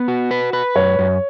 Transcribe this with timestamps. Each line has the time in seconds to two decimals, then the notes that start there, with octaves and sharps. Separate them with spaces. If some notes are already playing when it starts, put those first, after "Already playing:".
Already playing: B3
0.08 F#4
0.31 B4
0.53 B4
0.76 F#2 C#5
0.99 F#2